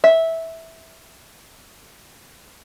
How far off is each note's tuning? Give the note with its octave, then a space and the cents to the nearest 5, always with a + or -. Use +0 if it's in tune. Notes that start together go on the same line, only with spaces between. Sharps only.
E5 -10